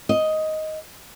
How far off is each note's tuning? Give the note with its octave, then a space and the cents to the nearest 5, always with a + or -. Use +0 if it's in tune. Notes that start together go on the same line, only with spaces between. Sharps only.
D#5 +5